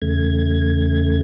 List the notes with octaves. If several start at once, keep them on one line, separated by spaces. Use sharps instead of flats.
E2 C#3 A3 G#6